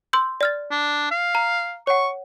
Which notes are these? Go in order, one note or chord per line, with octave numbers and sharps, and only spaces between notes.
C6 E6 G6
D5 F6 A6
D4
F5
A#5
C#5 F#5 C#6